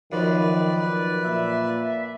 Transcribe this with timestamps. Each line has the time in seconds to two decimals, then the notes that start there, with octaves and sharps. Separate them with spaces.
0.12 F#2 D#3 F3 B4 D5
1.24 A#2 E5